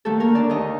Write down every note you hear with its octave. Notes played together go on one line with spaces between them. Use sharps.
D#2 A3 A4
A#3 A#4
D3
D4 D5
D#2 D#4 D#5